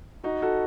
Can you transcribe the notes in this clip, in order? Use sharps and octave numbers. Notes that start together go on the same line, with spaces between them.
D#4 F#4
F#4 A4